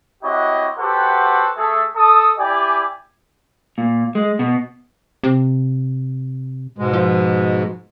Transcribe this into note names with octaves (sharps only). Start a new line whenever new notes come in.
C4 E4 F#4 G4 C#5 D#5
F#4 G4 A4 B4 C5 F#5
A3 G#4 A4
A4 D#6
E4 G4 D5 G#5
A#2
G#3
B2
C3
G#2 B2 G#3
F3